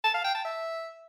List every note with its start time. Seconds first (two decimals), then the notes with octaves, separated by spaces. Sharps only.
0.04 A5
0.14 F5
0.24 G5
0.34 A5
0.44 E5